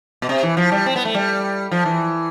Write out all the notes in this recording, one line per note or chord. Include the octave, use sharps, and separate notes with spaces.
B2
C3
E3
F3
G3
C4
B3
A3
G3
F3
E3